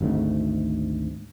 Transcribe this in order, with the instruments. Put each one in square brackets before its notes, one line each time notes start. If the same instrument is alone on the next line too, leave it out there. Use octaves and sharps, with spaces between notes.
[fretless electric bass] G#1 D2 G#2 A3